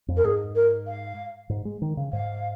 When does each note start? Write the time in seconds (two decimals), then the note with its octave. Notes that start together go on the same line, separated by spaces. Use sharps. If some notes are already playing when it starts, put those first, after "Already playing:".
0.08 F2
0.17 A#4
0.24 G#2 G#4
0.55 A#4
0.87 F5
1.49 G#2
1.65 G#3
1.82 D#3
1.97 C#3
2.13 G#2 F5